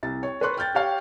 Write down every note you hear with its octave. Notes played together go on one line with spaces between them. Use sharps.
C2 A6
C#5
B4 C#5 C6 C#6 F#6
G5 F6 G6 A6
G4 C#5 F5 G5